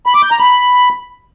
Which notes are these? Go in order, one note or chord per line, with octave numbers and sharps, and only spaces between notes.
B5
D6
G6
A#5
B5